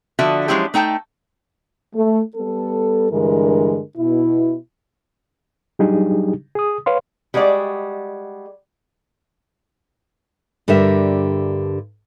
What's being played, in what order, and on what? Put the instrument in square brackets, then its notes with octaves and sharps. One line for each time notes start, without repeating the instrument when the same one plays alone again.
[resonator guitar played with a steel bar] D3 F3 F#4 E5
F3 F#3 G#3 C#4 E4 G4
A3 D#4 G5 A5
[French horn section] A3
G3 B3 A4
G2 D3 E3 G#3 A#4
B2 E4
[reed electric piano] F#3 G3 D4 D#4 G4 G#4
G#4 D#6
B4 C#5 F5 C6
[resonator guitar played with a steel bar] G3 G#3 F#4 A4 D5
[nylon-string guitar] G2 D3 G4 A#4 E5